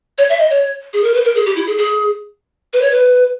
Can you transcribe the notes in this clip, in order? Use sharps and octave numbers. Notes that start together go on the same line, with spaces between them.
C#5
E5
D#5
C#5
G#4
A#4
B4
A#4
G#4
G4
E4
G#4
G#4
B4
C#5
B4